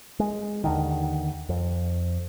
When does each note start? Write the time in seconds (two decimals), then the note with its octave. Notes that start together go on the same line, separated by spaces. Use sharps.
0.20 G#3
0.64 D#2 D3 D#3
1.49 F2